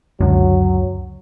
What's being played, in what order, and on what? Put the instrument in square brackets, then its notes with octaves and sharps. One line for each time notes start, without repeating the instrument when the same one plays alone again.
[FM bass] C#2 [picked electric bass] F#2 D3 [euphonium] F#3